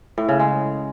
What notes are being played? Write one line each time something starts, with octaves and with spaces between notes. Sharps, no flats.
A2
C#3
G#3